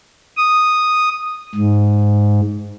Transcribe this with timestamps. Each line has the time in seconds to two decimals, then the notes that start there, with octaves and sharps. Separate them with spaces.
0.37 D#6
1.55 G#2